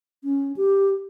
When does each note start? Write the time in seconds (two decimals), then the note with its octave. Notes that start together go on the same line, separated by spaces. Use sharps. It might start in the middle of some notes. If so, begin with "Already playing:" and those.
0.24 C#4
0.56 G4